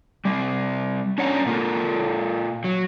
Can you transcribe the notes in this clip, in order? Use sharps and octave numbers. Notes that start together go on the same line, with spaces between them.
G3 C4
C#4 D4 C#5 F#5 A5 A#5
A#2 A#3 F4 A4
F#3